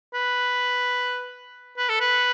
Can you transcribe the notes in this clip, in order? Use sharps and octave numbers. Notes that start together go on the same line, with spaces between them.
B4
B4
A4
B4